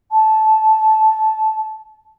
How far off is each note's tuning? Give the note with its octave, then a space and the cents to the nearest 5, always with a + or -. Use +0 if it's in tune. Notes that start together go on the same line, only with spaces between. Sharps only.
A5 -15